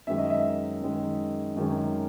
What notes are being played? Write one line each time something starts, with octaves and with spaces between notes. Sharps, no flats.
F#2 D#3 G#3 E5
D#5
E5
F#2 D#3 G#3
F#2 D#3 G#3